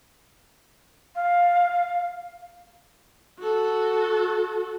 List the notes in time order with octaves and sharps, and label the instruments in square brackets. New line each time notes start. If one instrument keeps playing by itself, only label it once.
[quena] F5
[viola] F#4 A4